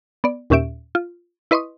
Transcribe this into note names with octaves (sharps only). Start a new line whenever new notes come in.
B3 D5
D#2 A#2 C#4 G4 E5 D7
F4
E4 B4 D#5 C6 C#6 D#6